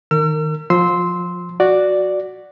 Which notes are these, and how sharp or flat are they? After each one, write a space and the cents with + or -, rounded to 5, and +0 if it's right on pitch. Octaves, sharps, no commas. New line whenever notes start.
D#3 +0 A#4 -25 E6 +45
F3 +20 C6 +0 E6 -20
F#4 +0 D5 +0